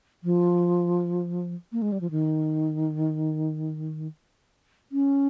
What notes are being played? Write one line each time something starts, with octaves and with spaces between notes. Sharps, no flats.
F3
A#3
G#3
G3
F3
D#3
C#4